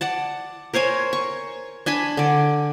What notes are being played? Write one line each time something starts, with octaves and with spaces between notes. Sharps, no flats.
D5 F#5 A5
A#4 C5 C#5 G#5
C#6
D4 G#5 A5 B5
D3 D5